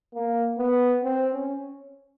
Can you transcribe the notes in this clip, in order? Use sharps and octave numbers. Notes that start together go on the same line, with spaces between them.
A#3
B3
C4
C#4